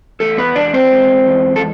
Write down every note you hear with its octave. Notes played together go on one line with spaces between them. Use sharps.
E2 A3 A4
B3 B4
E2 D4 D5
C4 C5
G#3
E2
A4